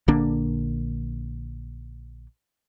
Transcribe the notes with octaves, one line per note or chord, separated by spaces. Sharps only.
A#1 D3 A#3 D4